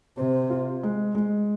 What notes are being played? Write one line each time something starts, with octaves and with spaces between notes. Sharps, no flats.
C3 C5
F4
G#3
G#3